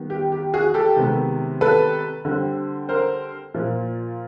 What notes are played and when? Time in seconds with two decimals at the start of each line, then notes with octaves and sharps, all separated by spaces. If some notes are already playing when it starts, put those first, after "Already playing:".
Already playing: D#3 G3 B3
0.10 G4
0.32 G4
0.53 F#4 G#4
0.74 G4 A4
0.96 C3 D#3 G#3 B3
1.61 A4 B4
2.25 D3 G3 C4
2.89 A#4 C5
3.54 A#2 F3 A#3